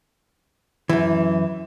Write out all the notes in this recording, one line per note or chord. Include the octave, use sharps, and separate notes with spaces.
F#2 E3